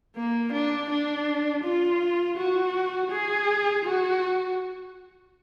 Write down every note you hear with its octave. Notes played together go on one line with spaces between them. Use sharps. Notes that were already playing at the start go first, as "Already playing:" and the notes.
A#3
D4
D4
F4
F#4
G#4
F#4